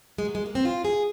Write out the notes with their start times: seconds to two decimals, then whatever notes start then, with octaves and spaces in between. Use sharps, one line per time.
0.18 G#3
0.25 F#3
0.35 G#3
0.46 A#3
0.55 C4
0.65 F4
0.85 G#4